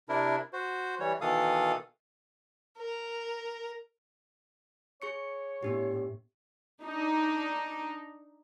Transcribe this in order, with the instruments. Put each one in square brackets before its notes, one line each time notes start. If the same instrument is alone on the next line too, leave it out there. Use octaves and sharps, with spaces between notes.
[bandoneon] C3 D4 E4 A#4
F#4 C5
E3 G3 C#5
B2 D#3 E3 A4 F5 D#6
[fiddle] A#4
[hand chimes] G#4 C#6 C#7 [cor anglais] C#5
[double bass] A2 [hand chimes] B3 D4 G4
[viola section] D4 D#4